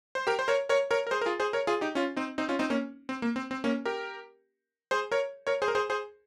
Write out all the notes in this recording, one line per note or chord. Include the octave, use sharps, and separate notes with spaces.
C5
G4 A#4
C5
A#4 C#5
A#4 C#5
A#4 C#5
A#4
G#4 C5
A#4
F4 G#4
G#4 C5
A#4 C#5
F4 G#4
D#4 G4
C#4 F4
C4 D#4
C4 D#4
C#4 F4
C4 D#4
A#3 C#4
C4
A#3
C4
C4
A#3 C#4
G4 A#4
G#4 C5
A#4 C#5
A#4 C#5
G#4 C5
A#4
G#4 C5
G#4 C5